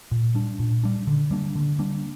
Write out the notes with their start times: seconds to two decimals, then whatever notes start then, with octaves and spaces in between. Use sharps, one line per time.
0.11 A#2
0.35 G3 D4
0.59 A#2
0.84 G3 D4
1.07 D3
1.31 G3 A#3 D4
1.55 D3
1.79 G3 A#3 D4